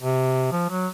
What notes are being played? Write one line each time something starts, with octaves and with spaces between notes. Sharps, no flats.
C3
F3
F#3